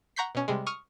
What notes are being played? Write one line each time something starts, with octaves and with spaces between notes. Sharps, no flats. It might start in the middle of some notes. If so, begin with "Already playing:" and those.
F#5 A#5 C#6 G6 B6 C7
B2 C#4
C3 G3 G#3
C#6 D#6 F6